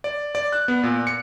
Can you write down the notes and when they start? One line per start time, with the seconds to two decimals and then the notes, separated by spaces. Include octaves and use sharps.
0.04 D5
0.35 D5
0.52 F#6
0.68 B3
0.83 A#2
1.07 C#7